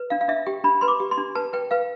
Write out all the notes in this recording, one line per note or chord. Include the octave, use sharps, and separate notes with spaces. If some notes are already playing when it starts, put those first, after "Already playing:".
Already playing: B4
D4 F5
F5
D4 E5
G4 G5
D4 B5
B4 C6
D6
G4
C6
D4
B4 A5
B4 G5
B4 F5